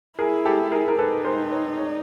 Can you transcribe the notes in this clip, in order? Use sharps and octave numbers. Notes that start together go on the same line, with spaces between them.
E4 G#4 A#4
G4 A4
G#4 A#4
A#4
D#4 A4 B4
A#4 C5
B4 C#5
C#5
D5